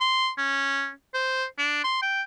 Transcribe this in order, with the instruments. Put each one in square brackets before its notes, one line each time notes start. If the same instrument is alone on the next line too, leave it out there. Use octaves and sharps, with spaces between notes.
[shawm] C6
C#4
C5
D4
C6
G5